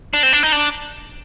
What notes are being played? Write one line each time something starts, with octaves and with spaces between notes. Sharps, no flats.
D4
C4
D4
D#4
D4